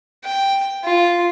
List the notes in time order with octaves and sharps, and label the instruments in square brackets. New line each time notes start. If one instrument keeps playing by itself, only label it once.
[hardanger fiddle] G5
F4